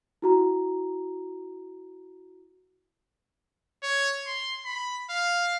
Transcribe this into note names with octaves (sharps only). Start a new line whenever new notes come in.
E4 F#4 A#5
C#5
C6
B5
F5